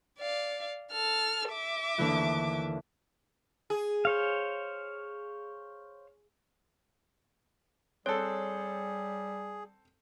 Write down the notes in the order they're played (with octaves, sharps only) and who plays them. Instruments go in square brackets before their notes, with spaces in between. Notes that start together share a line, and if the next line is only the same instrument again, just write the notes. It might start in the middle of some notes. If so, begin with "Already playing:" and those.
[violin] D5 F5
A4 F6
E5 D6
[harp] D#2 D3 E3
[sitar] G#4
[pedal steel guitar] C5 C#5 F5
[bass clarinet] G3 [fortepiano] C4 A4 [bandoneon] G#4 [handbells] C#5